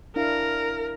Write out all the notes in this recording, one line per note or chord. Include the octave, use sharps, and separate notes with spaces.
D4 E4 A#4 F5